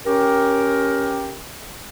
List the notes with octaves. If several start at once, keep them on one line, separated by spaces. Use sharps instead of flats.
C#4 G4 A#4